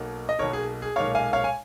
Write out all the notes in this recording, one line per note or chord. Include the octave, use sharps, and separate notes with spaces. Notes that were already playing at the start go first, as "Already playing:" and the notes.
Already playing: B1 B2 A#3
D#5
B1 B2 A#3 A#4 C#5
G#4
G#4
B1 A#2 G#3 C#5 F5
F5 G#5
C#5 F5
G#5